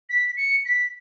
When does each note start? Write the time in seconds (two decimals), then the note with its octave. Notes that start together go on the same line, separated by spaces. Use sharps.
0.10 B6
0.37 C#7
0.65 B6